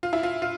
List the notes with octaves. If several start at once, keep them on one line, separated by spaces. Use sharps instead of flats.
F4
E4
F4
F4